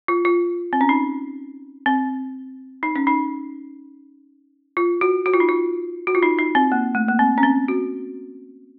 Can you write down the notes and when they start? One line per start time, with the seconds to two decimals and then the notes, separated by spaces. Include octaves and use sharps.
0.08 F4
0.25 F4
0.73 C4
0.81 C#4
0.89 D#4
1.86 C4
2.83 D#4
2.96 C#4
3.07 D#4
4.77 F4
5.01 F#4
5.26 F#4
5.34 F4
5.40 D#4
5.49 F4
6.07 F#4
6.15 F4
6.23 D#4
6.39 D#4
6.55 C4
6.72 A#3
6.95 A3
7.08 A#3
7.19 C4
7.38 C#4
7.43 C4
7.68 F#4